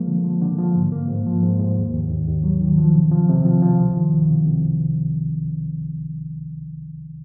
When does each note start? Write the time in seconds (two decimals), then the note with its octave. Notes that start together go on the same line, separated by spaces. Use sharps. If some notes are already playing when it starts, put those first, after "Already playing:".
Already playing: F3 G#3 A#3
0.08 D3
0.24 F3
0.41 D3
0.58 F3
0.76 G#2
0.92 A#3
1.08 G#2
1.26 F3
1.43 G#2
1.59 G#2
1.77 D#2
1.93 D#2
2.11 D#2
2.28 D#2
2.44 F#3
2.61 D#3
2.78 F3
2.95 C3
3.11 F3
3.29 C3
3.45 F3
3.62 F3
3.80 C2
3.97 D#3
4.13 C2
4.30 C3
4.47 C2